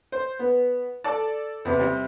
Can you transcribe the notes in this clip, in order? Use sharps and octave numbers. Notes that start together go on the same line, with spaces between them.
C5
B3
A4 D5 A5
E2 C3
C3 G3